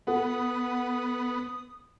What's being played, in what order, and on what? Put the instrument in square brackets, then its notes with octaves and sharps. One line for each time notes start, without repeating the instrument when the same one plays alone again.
[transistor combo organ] B3 [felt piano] A4 F#5 [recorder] D#6